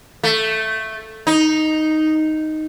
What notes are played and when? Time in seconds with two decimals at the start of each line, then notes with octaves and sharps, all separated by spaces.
0.23 A3
1.27 D#4